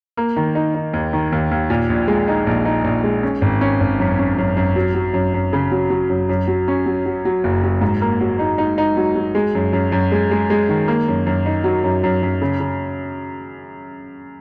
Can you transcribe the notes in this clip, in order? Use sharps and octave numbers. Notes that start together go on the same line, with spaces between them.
A#3
D#3
D#4
D#4
D#2
D#3
D#2
D#2
A#2
A#1
G#3
D#4
A#1
D#4
A#1
G#3
C#4
G#1
C#4
G#1
F#2
C#4
F#2
F#2
F#3
F#3
F#2
F#2
C#3
F#3
F#3
F#2
F#2
F#3
C#4
F#3
F#3
F#3
F#1
F#3
G#2
A#3
F#3
D#4
D#4
D#4
F#3
F#3
G#3
F#2
F#2
F#2
G#3
G#3
G#3
D#3
A#3
F#2
F#2
D#4
F#3
F#2
F#2
F#2
C#3
C#3